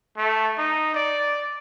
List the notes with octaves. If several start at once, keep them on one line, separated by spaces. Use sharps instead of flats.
A3
D#4
D5